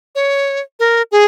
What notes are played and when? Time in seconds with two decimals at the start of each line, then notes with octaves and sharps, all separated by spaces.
0.15 C#5
0.80 A#4
1.12 G#4